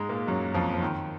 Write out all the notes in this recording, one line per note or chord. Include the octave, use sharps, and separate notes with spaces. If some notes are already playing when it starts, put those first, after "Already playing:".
Already playing: G#2 G#3
A#2 A#3
F#2 F#3
F2 F3
F3
D#3